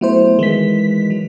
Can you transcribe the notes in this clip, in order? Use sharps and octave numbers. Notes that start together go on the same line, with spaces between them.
F#3 A3 B3 E4 C5
D#3 E3 G#3 B6
F#3